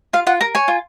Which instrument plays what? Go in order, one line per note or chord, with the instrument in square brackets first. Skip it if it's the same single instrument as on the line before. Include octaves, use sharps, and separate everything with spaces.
[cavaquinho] F4 F5
F4 F#5
A#4 A#5
C#5 G#5
F4